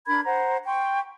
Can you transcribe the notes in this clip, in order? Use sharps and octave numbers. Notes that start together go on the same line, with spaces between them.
D4 A#4 B5 G#6
C5 F#5 A#5
G5 C6 C#6